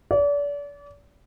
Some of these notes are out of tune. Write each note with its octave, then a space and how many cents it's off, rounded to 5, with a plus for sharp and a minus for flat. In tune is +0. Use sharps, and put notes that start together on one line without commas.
D5 -35